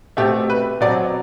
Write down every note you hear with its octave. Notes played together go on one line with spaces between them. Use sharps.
B2 A3 C4 G4
B4
B2 F#3 C4 D5